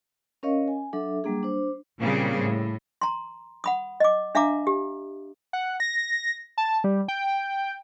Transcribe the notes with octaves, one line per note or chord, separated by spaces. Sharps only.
C#4 A#4 C#5 D#5 F5 C#6
G#5
F#3 D4 A4 E5
F#3 G3 A#3 D4 G#4
D4 C5
A#2 C#3 G3 A#3 C4 G#4
A2
A#5 C6
F#5 B5 D#6
D#5 D6
D4 E5 F5 A#5 D6
G4
F#5
A#6
A5
G3
G5